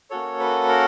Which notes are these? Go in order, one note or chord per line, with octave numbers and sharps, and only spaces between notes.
A#3 C#4 F#4 A4 C#5
B4
A#4